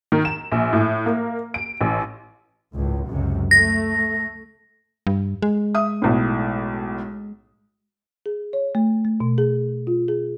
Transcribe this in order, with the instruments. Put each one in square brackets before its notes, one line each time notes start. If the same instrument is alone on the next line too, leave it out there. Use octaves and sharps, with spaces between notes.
[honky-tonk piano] D#3
E7
A#1
A2
A#3
D7
A1
[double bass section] G#1 C#2 A2
C#2 F#2 C3
[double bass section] A3 [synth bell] A#6
[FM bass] G2
G#3
[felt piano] E5 D#6
B1 A2
[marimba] G#4
C#5
A3
A3
B2
G#4
F4
G#4